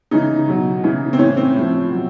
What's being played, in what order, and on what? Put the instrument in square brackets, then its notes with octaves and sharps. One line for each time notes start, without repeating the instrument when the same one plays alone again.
[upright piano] C#3 E3 D#4
B2 F#3
C#3 E3
C4
A2 E3 C#4
C4
A2 F3
B2 F#3